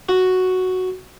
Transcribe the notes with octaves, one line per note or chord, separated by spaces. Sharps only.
F#4